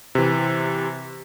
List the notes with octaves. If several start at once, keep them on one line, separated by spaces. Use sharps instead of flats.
C3 E3